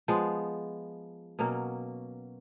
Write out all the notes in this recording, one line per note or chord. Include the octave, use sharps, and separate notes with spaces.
F3 G#3 B3
B2 F#3 A#3 C#4